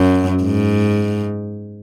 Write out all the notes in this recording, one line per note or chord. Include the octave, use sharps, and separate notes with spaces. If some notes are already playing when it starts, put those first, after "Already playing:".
Already playing: F#2
G#2